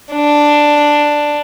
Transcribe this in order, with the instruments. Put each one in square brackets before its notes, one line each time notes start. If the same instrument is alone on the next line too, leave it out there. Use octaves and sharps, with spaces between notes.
[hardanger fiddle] D4